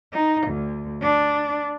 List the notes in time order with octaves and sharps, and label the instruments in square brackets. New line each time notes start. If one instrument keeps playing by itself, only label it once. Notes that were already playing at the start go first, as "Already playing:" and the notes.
[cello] D#4
D2
D4